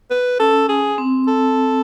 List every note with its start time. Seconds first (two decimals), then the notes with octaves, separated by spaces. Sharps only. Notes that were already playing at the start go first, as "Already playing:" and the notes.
0.10 B4
0.39 C#4 A4
0.69 G#4
0.98 C4
1.27 A4